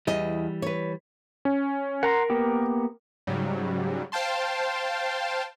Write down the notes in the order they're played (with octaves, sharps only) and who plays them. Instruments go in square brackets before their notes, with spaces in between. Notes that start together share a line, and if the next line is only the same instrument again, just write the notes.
[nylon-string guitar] E2 D#5 [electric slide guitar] E3 G3
[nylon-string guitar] B4 C#5
[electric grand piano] C#4
[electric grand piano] A#4 [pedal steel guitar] F#5 A#5 C6
[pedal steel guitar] A#3 B3 G4
[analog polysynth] G#2 C#3 F#3 G3
C5 F5 G5 A5 C6